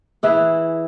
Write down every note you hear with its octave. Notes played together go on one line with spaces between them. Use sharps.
E3 E4 G#4